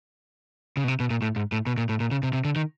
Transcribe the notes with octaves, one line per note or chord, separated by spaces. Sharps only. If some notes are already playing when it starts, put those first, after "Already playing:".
C#3
B2
C3
B2
A#2
A2
G#2
A2
B2
A#2
A2
A#2
C#3
C3
C3
D3
D#3